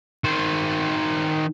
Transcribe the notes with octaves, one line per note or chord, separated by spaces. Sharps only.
D#3 C5